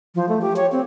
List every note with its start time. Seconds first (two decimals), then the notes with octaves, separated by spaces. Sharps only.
0.15 F3
0.29 A3
0.42 G4
0.56 C#5
0.72 C4